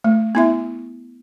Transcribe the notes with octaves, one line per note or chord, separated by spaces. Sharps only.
A3
B3 E4 E5